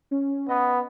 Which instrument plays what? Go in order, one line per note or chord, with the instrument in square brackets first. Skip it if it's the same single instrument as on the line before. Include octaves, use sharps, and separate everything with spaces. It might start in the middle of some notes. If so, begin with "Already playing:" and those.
[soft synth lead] C#4
[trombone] B3 [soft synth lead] D#5